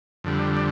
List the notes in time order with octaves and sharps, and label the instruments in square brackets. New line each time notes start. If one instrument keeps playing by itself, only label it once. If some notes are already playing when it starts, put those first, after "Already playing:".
[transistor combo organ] F2 D3 G3